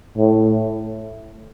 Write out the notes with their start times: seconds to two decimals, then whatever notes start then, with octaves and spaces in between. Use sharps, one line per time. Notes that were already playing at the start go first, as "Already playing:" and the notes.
0.18 A2